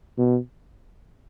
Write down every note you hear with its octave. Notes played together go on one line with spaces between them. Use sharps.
B2